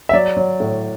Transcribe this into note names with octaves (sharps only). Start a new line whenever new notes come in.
E5
F#3 D5
F#3
A2